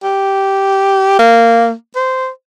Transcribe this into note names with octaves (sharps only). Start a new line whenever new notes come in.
G4
A#3
C5